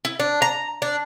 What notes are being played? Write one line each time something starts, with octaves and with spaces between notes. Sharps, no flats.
E4
D4
A#5
D4